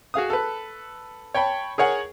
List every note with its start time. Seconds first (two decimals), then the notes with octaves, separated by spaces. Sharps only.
0.14 F#4 G#4 F5 D#6
0.30 A4 B4
1.34 C#5 G5 A5 B5
1.78 G#4 A#4 C#5 F#5 G#5